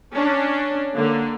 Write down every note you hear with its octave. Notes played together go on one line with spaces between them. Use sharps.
C#4 D4
D3 A#3